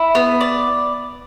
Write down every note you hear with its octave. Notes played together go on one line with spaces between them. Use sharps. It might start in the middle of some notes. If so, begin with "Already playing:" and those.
Already playing: E4
B3
D5